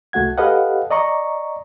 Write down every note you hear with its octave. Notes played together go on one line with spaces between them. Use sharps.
C2 A3 F#4 F#5 G#6
G4 A4 B4 D#5 F5 F#5
D5 D#5 A#5 C#6